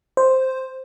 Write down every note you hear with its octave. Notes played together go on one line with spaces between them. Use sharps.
C5